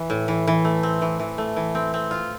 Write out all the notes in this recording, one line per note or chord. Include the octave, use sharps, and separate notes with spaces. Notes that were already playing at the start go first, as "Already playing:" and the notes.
Already playing: E3
A2
E3
E3
A3
C4
E3
E3
A3
E3
C4
C4
F4